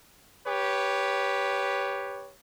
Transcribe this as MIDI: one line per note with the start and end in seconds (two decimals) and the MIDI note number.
0.46 2.32 67
0.46 2.32 71
0.46 2.32 73